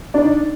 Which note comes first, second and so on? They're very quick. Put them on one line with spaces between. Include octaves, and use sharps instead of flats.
D4 D5 D#4